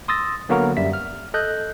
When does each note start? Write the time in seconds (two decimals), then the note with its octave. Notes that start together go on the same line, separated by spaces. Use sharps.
0.08 C6 D#6 E6 A6 A#6
0.49 D3 F#3 A#3 B3 F#4 A#4
0.77 F#2 G3 E5 B6
0.93 F6
1.34 A4 D#5 F#6 G6